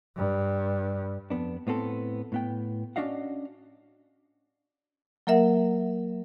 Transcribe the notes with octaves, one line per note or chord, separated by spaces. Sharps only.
G2
F2 B3 D4
A2 B3 C4 A4
A2 B3 G5
C#4 D4 F#4 D#5 F5 F#5
F#3 A#3 A#4 E5 F#5